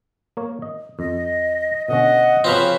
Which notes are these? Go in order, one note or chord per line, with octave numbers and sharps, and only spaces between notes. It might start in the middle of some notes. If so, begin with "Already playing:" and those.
A#3 A#4 C#5
D#5
F2 D#5
B2 D3 C#4 D#5 F#5
C#3 F3 C4 F4 B4